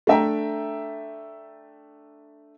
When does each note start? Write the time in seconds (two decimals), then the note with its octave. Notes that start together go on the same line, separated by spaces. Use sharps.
0.07 A3 D4 E5 G5 A#5